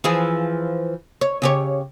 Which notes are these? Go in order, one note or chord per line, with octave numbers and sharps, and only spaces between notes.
E3 F3 G#4
C#5
C#3 G4 C#5